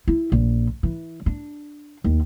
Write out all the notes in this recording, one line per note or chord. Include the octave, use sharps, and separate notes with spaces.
E4
A#1
E3
D4
D#2